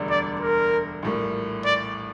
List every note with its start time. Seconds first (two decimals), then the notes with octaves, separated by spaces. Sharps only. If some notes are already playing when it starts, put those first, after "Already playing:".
Already playing: E1 D2 D3 G3 D4
0.10 D5
0.41 A#4
1.03 A#1 A2 G3 A#3
1.65 D5